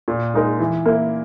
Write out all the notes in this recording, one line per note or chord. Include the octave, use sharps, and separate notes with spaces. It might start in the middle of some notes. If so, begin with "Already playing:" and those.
A#2
G#3 D#4 A#4
E3
A#3 E4